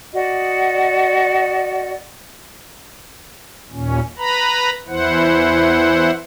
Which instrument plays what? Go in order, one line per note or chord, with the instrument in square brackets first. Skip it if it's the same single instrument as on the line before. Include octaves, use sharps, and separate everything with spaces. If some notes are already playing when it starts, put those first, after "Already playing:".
[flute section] F#4 D5 D#5
[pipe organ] D#2 A#2 C#4
B4 A#5 B5
E2 E3 E4 C5 F#5